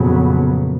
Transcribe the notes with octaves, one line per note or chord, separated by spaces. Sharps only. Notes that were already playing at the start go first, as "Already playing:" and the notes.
Already playing: F2 A#2 C#3 F#3 B3